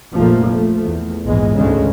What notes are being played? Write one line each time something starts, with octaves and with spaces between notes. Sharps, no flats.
F1 A#1 A#2 F3 A3 A#3
F3 A3
E2
A#1 E2 G#2 G#3
D2 G#2 C#3 G#3